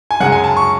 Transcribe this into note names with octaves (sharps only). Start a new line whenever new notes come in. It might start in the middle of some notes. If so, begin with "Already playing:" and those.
G#5
F#2 C#3 G#3 F#5
G#5
A5
C#6